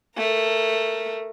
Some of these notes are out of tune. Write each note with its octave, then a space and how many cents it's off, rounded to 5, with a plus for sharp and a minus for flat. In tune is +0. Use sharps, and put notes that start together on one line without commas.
A3 +10 A#4 +0